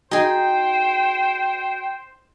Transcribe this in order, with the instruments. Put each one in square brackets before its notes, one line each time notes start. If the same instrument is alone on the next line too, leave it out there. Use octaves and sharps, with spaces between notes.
[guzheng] D#4 G#4 [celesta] F#4 D#5 [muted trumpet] C5 [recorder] G5